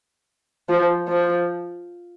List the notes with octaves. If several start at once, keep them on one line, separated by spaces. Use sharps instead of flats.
F3
F3